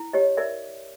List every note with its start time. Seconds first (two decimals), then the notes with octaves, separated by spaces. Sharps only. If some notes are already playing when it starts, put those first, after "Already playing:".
Already playing: E4
0.13 G4 C#5 D#5
0.37 A#4 D5 E5